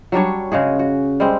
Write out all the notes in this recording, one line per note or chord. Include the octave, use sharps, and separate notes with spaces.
F#3 G3 D4 C#5
C#3 G#3 F#4 G#4
F#4
G3 G#3 C4